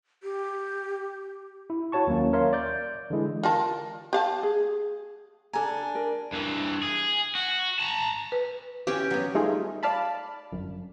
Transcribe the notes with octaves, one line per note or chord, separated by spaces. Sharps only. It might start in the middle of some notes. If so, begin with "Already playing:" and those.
G4
E4
E4 F#4 C#5 A5 C#6
D#2 F#3 A#3 C#4
A#4 C#5 E5 F5 C6
D5 G6
D3 E3 G#3 E4
F4 A#4 A5
G4 F5 A5
G#4
D4 A4 G#5 A#5
A#4
G2 E3
G#4
F#4
A5 A#5
B4
E3 C#4 G4
F#3 B3
G3 A3 D#4 F4 G#4
D5 F5 A5 B5
G1 F#2